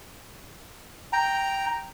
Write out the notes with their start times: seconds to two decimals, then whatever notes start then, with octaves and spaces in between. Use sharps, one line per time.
1.13 G5 A#5